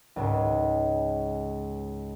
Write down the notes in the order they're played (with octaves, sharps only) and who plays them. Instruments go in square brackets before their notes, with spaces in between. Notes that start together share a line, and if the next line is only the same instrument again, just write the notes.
[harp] C#2 G#2 C#3